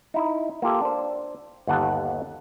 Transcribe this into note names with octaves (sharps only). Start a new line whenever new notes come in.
D#4 E4
A#3 F4 G4 A4
D4 C5
G1 D#2 F#5 A5